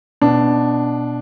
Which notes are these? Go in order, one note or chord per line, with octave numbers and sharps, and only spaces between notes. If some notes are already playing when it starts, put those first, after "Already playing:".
B2 D4